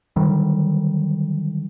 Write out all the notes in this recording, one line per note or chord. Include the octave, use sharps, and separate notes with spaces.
D3 D#3 F#3 G3